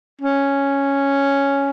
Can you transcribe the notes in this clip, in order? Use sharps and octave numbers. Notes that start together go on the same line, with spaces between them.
C#4